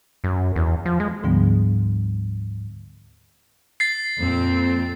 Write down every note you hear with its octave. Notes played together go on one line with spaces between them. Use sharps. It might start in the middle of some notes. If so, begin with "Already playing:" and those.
F#2
E2
F3
G#3
D2 G#2 D3 F3 G3 B3
A6 C7
F2 A#2 C4